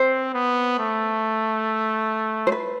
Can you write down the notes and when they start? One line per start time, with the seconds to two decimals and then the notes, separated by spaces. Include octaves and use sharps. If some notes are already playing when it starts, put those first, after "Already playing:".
Already playing: C4 C5
0.34 B3
0.78 A3
2.47 C5
2.52 B4